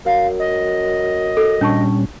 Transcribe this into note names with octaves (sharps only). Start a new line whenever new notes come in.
F#2 F5
D#5
A4
A#2 G3 C#4 D4 A5 C#6